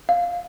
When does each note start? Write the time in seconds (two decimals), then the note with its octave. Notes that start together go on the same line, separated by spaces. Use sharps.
0.09 F5